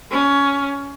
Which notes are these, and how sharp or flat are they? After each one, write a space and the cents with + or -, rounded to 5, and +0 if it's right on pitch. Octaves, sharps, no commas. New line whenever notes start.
C#4 +15